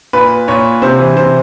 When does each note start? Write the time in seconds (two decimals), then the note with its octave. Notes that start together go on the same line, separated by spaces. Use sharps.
0.13 A#2 B4
0.48 A#2 C#5
0.82 C3 C5
0.99 E3
1.16 C3 C5